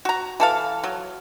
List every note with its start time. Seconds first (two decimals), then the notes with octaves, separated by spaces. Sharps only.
0.05 F#4 A#5
0.40 E3 A4 F5
0.84 F#3